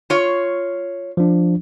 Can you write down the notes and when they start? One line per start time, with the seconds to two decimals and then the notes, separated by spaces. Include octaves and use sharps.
0.10 F4 C#5
1.17 F3 D4